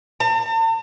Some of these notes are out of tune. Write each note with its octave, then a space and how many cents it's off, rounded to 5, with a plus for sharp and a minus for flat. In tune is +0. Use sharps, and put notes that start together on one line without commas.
A5 +45